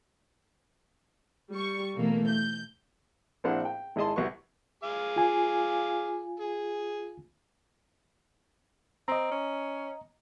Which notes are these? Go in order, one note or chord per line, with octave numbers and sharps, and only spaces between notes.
G3 C#6
B2 E3 A3 A#3
G6
A#1 C4 D4 E4 F5 F#5
G5
G#1 E4 G#4 D#5 A5 C6
C2 F#4 B4 C#6
G#4 F5 D6
F4 G#5
G#4
C4 D#5 A#5
C#4